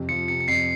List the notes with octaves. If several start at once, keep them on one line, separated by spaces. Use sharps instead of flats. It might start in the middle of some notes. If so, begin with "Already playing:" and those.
Already playing: F2 C3
F3 C#7
C3 C#7
C#7
F2 C7